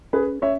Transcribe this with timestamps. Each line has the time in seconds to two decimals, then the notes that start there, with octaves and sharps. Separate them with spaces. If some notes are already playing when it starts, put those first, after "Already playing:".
0.13 C#4 G#4 B4
0.42 C#4 C#5 E5